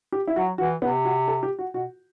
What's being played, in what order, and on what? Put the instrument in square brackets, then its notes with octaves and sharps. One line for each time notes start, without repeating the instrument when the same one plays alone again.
[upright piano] G4
E4
[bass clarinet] F#3 [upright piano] F#4
[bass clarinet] E3 [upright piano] F#4
[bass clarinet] C3 [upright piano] B3
[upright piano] F#4
A4
G4
F#4
[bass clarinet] B2 [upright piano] F#4